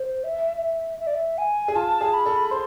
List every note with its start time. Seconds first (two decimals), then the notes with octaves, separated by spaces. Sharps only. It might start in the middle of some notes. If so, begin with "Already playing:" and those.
Already playing: C5
0.24 E5
0.62 E5
1.00 E5
1.07 D5
1.14 E5
1.38 G#5
1.68 G#4
1.75 F4 A5
2.01 G#4
2.14 B5
2.26 A4
2.51 C5 C6